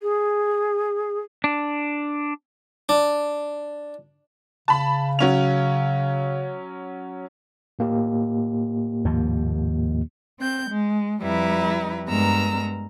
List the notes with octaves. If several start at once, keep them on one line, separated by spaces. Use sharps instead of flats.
G#4
D4
D4
C#3 A5 B5
F#3 C#4 F7
A2 A#3 G4
D#2 G#2 F3
C4 G6
G#3
F2 G3 E4 B4 A#5
G2 G#3 B3 A#4 A#5 E6